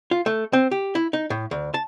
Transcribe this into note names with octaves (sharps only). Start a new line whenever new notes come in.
F4
A3
C4
G4
E4
D#4
A2
D2
A5